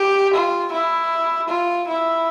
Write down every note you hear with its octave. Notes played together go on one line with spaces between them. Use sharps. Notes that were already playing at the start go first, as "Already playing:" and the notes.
Already playing: G4
F4
E4
F4
E4